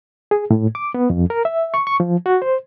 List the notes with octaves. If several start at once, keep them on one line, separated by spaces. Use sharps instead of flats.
G#4
A2
D6
B3
F2
A#4
E5
C#6
C#6
F3
F#4
C5